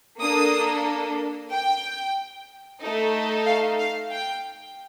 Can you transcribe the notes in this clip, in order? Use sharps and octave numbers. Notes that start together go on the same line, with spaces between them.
A#3 D4 A4 D#6
G5
A3 D#4 A4
F5
F5
G5